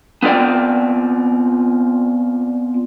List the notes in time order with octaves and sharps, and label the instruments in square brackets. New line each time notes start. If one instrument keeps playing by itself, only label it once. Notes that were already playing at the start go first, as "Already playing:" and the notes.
[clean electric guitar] B3 C4 F4 D5 G5